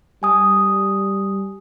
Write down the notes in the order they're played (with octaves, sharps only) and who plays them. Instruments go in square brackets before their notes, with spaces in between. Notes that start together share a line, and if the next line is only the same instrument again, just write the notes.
[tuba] G3 [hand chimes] G#5 D#6